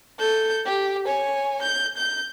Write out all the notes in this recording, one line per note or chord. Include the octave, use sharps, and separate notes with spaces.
A4 G6
G4
C#5 G#5
G6
G6